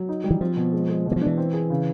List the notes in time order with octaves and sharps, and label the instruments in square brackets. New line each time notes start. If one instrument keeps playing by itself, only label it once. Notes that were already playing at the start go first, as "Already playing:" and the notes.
Already playing: [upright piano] F#3
D#4
G3
[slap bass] E3
[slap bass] F3 [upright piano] C4
[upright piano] B2
G#3
G#3
B2
[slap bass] E3
F3
[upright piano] D4
[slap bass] E3
[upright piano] C4
G#4
C#3